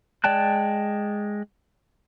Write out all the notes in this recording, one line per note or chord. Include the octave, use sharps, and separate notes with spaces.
G#3 D5 G5 A5 F#6